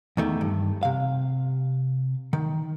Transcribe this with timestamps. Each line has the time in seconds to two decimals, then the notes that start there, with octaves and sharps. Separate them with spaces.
0.17 E2 D#3 A3
0.41 G2
0.83 C3 F5
2.33 D#3